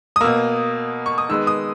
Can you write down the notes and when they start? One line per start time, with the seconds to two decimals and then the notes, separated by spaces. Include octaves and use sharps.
0.16 D#6
0.21 B2 A#3 E6
1.06 C#6
1.18 D#6
1.29 D#3 G#3 B3 E6
1.47 D#6